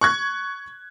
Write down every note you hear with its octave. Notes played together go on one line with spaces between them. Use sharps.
C#6 F#6 G#6